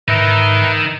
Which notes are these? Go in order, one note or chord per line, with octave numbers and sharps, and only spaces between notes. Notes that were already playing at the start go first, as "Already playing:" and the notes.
G#2 D#4 A#4 B4 E5